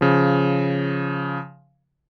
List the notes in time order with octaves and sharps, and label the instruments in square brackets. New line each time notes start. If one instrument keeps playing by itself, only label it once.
[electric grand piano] C#3 F3